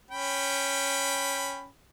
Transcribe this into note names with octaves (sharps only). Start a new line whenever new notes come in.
C#4 G5 B5